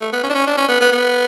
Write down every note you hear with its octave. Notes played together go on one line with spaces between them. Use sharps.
A3
B3
C#4
D4
C#4
D4
C#4
B3
B3
B3